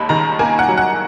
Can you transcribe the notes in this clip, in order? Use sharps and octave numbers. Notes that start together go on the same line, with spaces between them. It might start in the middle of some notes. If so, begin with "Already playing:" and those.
Already playing: D#2 G#3 B5
D#3 A#5
A#3 G#5
F#5
F#3
F#5